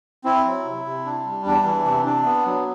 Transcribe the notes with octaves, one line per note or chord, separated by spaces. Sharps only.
C4 E4
F#3
C3
C3
D4
G3
E2 D4
E3
C3
D4
B3
F#3